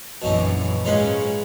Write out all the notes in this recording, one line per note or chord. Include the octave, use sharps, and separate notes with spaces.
A#1 F#2 B2 E3 C#4 D#4
G#2 G#3 C#4 D#4 F4 B4